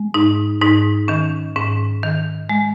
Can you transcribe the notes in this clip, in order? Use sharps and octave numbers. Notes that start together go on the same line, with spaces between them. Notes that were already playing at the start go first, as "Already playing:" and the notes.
Already playing: G#3
G#2 D#4
G#2 D#4
D#3 C#4
G#2 C#4
D#3
G#3